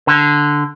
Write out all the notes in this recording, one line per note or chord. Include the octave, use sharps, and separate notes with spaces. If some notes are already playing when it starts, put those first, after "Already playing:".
D3